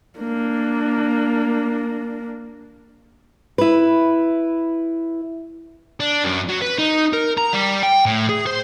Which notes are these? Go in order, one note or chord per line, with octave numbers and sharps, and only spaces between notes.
A#3 D4
E4 B4
D4
F#2
F#3
B4
D#4
A#4
A#5
G3
G5
A2
G#4
C5